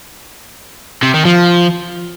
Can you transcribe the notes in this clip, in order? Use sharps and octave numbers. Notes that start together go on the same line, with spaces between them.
C3
D#3
F3